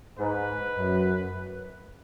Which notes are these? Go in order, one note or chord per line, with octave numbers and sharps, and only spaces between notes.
G#2 B4
F#2